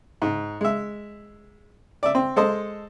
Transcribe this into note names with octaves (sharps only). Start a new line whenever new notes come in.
G#2
G#3 E5
D5 E5
C4
G#3 A4 C5 D#5